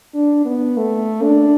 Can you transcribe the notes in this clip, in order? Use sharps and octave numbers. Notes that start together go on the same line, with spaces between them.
D4
B3
A3
D4